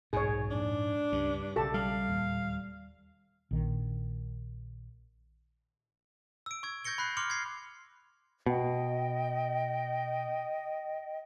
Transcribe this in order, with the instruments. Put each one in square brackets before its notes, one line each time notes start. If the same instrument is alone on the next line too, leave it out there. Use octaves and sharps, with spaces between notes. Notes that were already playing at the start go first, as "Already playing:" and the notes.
[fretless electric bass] D#1 B1 [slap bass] G#2 [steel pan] G#4 C#5
[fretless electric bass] F2 A#2 [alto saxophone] D4
[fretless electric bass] C#2 C#3 [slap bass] G2
[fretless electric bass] B1 C#3 [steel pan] G4 A4 A5
[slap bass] G3 [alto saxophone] F5
[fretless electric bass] E1 D#2 A#2
A#1 D#3
[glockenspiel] E6 D7
C#6 E6 G#6
C#6 G6 G#6 A#6 C#7 G7
B5 F#6 C7
C6 D6 F6 C#7 F7
G#6 C7
[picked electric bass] B2 [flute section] D#5 G5